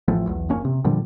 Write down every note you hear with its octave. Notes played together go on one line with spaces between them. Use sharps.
A1 F3 A3
B1 E2
F#1 A#3 C#4
C3
A#2 D3 F3 G3